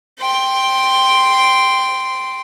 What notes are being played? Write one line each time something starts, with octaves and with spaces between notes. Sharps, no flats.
G5 C6